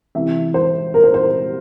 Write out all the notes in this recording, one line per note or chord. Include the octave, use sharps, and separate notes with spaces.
C3 E3 E5
C5
A#4
C5
C5